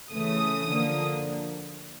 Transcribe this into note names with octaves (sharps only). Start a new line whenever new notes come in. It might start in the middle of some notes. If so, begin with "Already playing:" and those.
C#3 E3 A3 D#6
D3 F3 A#3